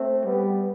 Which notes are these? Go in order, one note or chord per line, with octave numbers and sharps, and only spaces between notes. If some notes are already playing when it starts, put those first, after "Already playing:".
Already playing: A3 C4
G3 B3